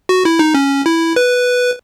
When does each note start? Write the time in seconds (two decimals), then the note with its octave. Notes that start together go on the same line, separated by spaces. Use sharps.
0.09 F#4
0.25 E4
0.39 D#4
0.54 C#4
0.86 E4
1.16 B4